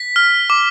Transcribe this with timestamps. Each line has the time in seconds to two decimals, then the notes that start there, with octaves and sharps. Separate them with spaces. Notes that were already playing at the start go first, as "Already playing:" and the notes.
Already playing: B6
0.16 F6
0.50 D6